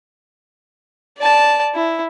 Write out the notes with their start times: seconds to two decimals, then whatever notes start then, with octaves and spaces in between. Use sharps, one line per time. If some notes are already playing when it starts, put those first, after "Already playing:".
1.19 D5 A5
1.74 E4